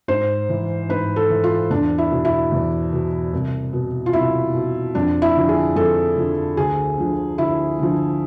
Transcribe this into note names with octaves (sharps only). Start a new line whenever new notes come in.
G#2 C5
E3
G#2 B4
A4
E3
F4
E2 D4
E4
B2
E4
E2
B2
C2
B2
F4
C2 E4
B2
F2 D4
E4
D3 F3
G#4
F2 A4
D3 F3
D2 G#4
D3 F3
D2 E4
D3 F3